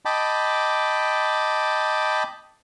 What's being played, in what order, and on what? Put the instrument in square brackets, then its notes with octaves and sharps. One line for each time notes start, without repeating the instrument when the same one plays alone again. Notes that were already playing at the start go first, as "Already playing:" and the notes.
[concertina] D#5 G5 A5 B5 D6